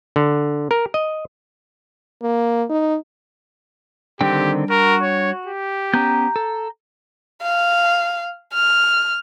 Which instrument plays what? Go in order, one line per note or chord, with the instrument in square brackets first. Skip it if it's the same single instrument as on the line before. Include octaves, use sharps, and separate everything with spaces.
[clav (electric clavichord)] D3
A#4
D#5
[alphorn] A#3
D#4
[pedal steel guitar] D3 D#3 C4 [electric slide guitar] G3 D4 G5 [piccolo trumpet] G4
[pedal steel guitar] F#4 [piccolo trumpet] A#4
[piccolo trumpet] C#5
G4
[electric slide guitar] B3 C#4 [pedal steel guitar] A#5 G6
[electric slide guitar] A4
[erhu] F5
F6